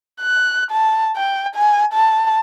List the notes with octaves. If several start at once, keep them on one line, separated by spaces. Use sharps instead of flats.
F#6
A5
G5
G#5
A5